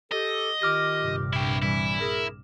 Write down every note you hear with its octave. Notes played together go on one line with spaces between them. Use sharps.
G4 A4 D#5
D#3 F4 G4 D6 F6 A#6
A#1 G2 C3
E4 G5
E3 G3 E4
G#4 A#4